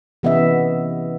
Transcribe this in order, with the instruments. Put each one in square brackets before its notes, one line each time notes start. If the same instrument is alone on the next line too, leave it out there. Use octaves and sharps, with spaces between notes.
[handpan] C3 E3 B3 C#4 D#5 E5